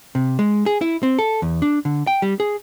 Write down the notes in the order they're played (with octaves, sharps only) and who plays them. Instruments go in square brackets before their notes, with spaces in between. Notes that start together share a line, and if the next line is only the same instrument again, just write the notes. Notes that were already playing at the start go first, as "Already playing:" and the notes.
[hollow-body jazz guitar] C3
G#3
G#4
E4
C4
A4
E2
D4
D3
G5
G3
G#4